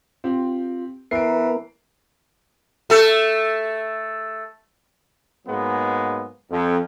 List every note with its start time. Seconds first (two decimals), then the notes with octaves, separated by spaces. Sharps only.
0.24 C4 F4 G4
1.11 E3 B3 A#4 B4 C7 D7
2.90 A3 A4
5.46 G#2 F#3 G#3 A#3 B3
6.49 F2